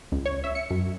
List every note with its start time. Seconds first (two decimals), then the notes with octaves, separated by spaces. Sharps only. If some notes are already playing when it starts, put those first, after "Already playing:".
0.12 C#2
0.25 C#5
0.44 E5
0.55 C#7
0.71 F#2